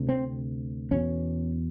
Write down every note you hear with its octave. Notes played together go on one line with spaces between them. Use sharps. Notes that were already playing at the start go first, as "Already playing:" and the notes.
Already playing: D2 C3
C4
E2 B2 C#4